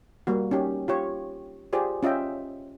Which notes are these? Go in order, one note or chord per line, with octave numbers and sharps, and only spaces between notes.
G3 A#3 F#4
C#4 D#4 G4
F4 G4 C#5
F4 G4 G#4 C5 D5
C#4 F4 D#5 E5 G5